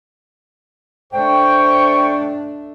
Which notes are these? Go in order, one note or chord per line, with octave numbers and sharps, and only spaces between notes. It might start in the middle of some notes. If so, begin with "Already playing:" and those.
A3 D4 C5 G5 C#6